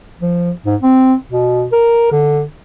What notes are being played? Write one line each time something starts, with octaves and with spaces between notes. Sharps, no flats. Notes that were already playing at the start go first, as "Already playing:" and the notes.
F3
G#2
C4
B2
A#4
D3